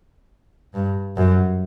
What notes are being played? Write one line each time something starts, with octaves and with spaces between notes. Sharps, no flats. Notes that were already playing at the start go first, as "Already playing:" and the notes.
G2
F#2